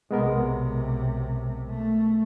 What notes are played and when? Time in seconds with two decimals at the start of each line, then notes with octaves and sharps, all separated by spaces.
0.11 B1 C3 G#3 B3 A#4
1.70 A3